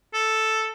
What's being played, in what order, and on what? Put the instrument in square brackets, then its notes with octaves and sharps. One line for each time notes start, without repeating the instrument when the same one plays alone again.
[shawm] A4